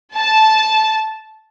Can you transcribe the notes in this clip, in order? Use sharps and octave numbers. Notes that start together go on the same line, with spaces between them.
A5